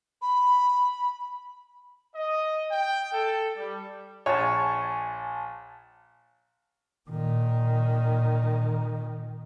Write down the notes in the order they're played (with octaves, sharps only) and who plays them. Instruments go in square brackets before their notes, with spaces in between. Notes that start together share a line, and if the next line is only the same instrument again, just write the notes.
[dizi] B5
[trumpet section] D#5
G5
A4
G3
[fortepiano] A#1 C#5 [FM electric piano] G#5 A5
[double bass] A#2 D#3